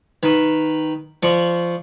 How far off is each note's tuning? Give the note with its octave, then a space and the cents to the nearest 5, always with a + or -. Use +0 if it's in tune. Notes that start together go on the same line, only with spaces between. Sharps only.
D#3 +0 B4 +0
F3 -15 D5 +5 C#6 +0